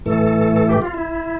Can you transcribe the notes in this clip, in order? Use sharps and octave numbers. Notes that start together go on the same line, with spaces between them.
A2 E3 A3 A4
A4
G4
F4
E4